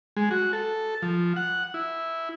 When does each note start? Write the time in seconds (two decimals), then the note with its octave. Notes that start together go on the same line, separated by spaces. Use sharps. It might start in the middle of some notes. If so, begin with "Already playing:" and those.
0.17 G#3
0.31 F#4
0.53 A4
1.02 F3
1.36 F#5
1.74 E4